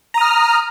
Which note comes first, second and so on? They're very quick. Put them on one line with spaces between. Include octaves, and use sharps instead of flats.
A#5 D#6 F6